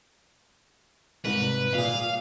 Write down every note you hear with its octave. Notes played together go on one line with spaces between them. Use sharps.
C2 G#2 A#4 B4
A#2 G#4 F5